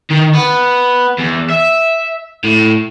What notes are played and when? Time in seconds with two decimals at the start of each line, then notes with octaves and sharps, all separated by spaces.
0.10 D#3
0.34 B3
1.19 E2
1.50 E5
2.44 A2